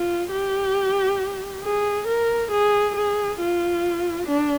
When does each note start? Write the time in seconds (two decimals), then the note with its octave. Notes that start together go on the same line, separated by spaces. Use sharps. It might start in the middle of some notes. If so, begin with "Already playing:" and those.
Already playing: F4
0.31 G4
1.64 G#4
2.07 A#4
2.51 G#4
2.96 G#4
3.40 F4
4.28 D4